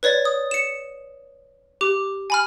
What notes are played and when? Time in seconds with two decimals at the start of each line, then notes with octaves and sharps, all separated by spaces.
0.03 B4 C#5 D5 A6
0.25 D#6
0.51 C#7 E7
1.81 G4 D6
2.30 G#5 B5 F6